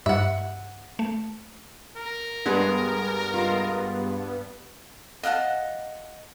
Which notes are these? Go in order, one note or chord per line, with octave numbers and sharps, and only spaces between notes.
G2 E5 F#5
A3
A#4
G2 G#3 B3 G#4
G#3 F4
D#5 F5 F#5 A5